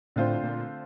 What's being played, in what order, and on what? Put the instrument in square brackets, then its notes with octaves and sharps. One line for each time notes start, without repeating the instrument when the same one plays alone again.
[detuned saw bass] A2 [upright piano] D3 A3 C4 F4 C5
[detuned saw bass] A#2